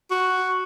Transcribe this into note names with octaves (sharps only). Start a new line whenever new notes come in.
F#4